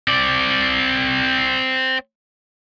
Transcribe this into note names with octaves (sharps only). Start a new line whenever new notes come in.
C4 D5